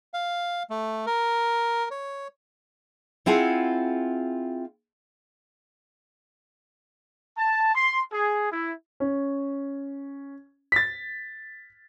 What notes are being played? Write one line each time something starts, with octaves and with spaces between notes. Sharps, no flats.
F5
A3
A#4
C#5
C4 E4 F4 G#4 F#5
A5
C6
G#4
E4
C#4
A6 B6